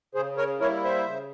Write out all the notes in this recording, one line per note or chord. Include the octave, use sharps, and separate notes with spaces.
C#3 G#4 C5
A#4 C#5
G3 A#3 E4 A#4 C#5
C5 E5
C#3